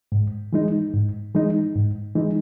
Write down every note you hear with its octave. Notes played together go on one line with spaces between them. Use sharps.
G#2
E3 G#3 D#4
G#2
E3 G#3 D#4
G#2
E3 G#3 D#4